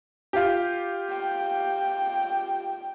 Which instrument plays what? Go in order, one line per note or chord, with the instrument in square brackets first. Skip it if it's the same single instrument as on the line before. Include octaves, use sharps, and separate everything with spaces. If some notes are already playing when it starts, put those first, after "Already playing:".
[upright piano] F4 G4
[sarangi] G5